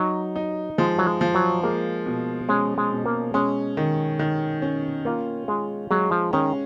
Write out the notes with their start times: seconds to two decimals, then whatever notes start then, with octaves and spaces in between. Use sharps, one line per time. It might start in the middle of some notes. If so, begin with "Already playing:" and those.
Already playing: F#3 D#4
0.36 D#4
0.78 F3 G#3
0.99 F#3
1.07 G#3
1.21 F3
1.35 F#3
1.63 G#3 A#3
2.06 B2
2.49 G#3 C#4
2.78 G#3
2.92 B2
3.06 A#3
3.34 G#3 C#4
3.77 D#3
4.19 D#3
4.62 C#4
5.05 A#3 F4
5.48 G#3 F4
5.91 F#3 G#3
6.11 F3
6.33 D#3 C#4